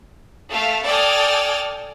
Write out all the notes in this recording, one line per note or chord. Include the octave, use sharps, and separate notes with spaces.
A3 F5
A4 D5 G5 G#5 D#6 F6